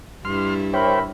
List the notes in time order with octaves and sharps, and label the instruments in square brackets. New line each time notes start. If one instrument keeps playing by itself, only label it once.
[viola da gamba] G2 G3 E4 [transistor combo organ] C6 F6
[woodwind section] A#4 E5 B5 [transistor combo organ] C5 C#5 G5